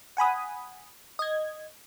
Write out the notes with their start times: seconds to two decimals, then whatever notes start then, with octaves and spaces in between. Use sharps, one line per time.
0.17 F#5 G#5 B5 D#6
1.19 D#5 G#6